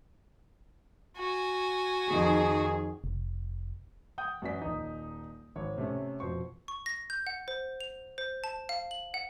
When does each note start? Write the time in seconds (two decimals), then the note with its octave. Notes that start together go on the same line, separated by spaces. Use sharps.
1.17 F#4 G#5
2.10 F2 D#3 G#4
3.04 F1
4.18 F#5 G5 D#6 G6
4.42 F#2 E3 F#4 D5 B6
4.62 D#1 D#4
5.56 G#1 C#5
5.78 C3 A3 C#4
6.20 F2 B2 C5 C#6
6.68 C#6
6.86 A#6
7.10 G6
7.27 F#5
7.48 C5
7.81 F7
8.18 C5
8.44 A5
8.69 F5
8.91 F#7
9.14 F#5